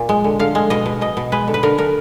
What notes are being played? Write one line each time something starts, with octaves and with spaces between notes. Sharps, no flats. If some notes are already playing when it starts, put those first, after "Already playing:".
Already playing: A#2
G#3
D3
D3 F5
G#3
B2 D#5
B2
B2 D#5
B2
G#3 B4
D3
B4
D3 A#4
D3 A#4